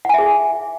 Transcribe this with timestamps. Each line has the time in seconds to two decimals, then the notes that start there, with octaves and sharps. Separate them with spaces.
0.05 F#5
0.09 G#5
0.14 E5
0.18 G#4